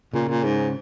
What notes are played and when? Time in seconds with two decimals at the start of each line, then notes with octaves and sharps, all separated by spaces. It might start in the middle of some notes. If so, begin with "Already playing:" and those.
0.14 A#2 C#3
0.29 A#2
0.44 G#2